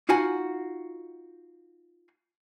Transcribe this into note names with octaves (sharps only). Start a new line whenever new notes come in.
D#4 F4 F#4 F#5 G#5